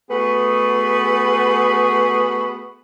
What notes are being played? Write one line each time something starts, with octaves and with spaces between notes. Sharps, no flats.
A3 B3 F#4 G#4 B4